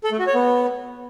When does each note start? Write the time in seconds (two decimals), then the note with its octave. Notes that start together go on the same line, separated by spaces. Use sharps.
0.04 A4
0.12 A3
0.19 F#4
0.27 C#5
0.34 B3